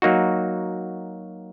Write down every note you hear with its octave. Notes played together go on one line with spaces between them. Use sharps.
F#3 A#3 D#4 F#4